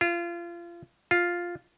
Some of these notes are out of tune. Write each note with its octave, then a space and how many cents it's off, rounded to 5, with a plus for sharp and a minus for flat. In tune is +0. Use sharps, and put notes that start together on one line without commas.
F4 -30
F4 +0